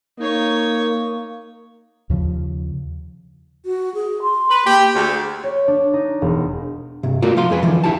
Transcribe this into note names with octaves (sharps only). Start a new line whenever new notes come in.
A#3 D#4 C#5
D#2 C#3 F3
F#4
G#4
C6
B4
A#3 G4
D2 G#4
C#5
D4
D#4
E1
G2 C3
A3 F4 F#4 A#4 D5
B1 F3 F5 C6
F2 G#3 G#4 B4
D3 E3 F3
D#2 E4 G4 A5